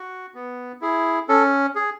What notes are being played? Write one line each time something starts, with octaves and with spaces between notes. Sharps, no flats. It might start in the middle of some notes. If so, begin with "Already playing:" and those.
Already playing: F#4
B3
E4 G#4
C#4 A4
G#4